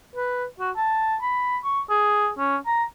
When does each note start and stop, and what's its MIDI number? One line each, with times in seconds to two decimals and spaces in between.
0.16 0.45 71
0.60 0.71 66
0.76 1.16 81
1.22 1.58 83
1.64 1.81 85
1.90 2.29 68
2.38 2.57 61
2.66 2.84 82